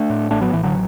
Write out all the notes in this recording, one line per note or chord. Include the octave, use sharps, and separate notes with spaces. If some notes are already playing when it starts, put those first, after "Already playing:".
Already playing: A3 D4
A2
A1 A3 D4
F#3 B3
A1 E3
D3 F#3